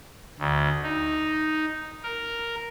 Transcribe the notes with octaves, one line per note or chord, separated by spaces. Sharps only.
D2
D#4
A#4